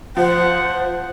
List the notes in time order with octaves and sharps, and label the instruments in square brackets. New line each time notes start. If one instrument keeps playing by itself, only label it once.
[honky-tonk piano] F3 [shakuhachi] C5 [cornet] F#5